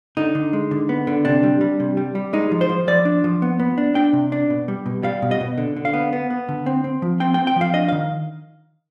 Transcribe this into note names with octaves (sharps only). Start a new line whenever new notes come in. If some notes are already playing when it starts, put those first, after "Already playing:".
D3 D#4
D3
G#3
D3
B3
D3
C3 D4
G3
G3
C3
G3
G3
G#3 D#4
F3
C5
F3
F3 D5
D4
F3
B3
B3
D4
D4 G5
C3
D4
B2
G3
B2
G3 F5
B2
D#5
B2
D3
D3
F5
B3
B3
B3
D3
C4
C4
F3
C4 G5
G5
C4
G5
F3 F5
D4 D#5
D#3 F5